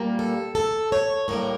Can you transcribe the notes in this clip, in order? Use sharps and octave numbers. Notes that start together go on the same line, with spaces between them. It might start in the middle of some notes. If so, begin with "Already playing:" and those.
Already playing: A#2 G3 A#3
A4
A4
C#5
A2 G3 A#3 A#4